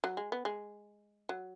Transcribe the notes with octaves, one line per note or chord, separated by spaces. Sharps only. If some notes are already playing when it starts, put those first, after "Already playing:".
F#3
G#3
B3
G#3
F#3